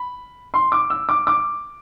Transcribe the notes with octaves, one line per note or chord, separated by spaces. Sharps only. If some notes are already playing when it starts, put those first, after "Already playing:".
Already playing: B5
C6
D6
E6
D6
D6